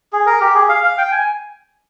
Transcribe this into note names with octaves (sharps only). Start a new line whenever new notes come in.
G#4
A#4
G4
G#4
F5
F5
G5
G#5